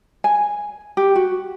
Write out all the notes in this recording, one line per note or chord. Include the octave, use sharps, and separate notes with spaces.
G#5
G4
F#4